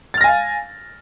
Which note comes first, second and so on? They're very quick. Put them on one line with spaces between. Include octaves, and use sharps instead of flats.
A6 F6 A#6 G#5 F5